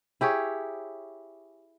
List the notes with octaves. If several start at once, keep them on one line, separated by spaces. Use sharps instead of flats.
E4 G4 G#4 C#5